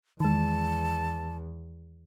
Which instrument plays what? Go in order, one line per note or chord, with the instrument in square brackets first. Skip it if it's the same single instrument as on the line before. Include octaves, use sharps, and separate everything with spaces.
[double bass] E2 [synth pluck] D#3 G#3 [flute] A5